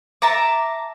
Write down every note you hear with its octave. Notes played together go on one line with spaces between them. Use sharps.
E5 A5 A#5 D6